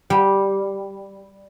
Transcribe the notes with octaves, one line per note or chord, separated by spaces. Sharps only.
G3